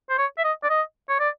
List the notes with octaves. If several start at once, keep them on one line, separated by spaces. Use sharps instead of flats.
C5
C#5
E5
D#5
D5
D#5
C#5
D5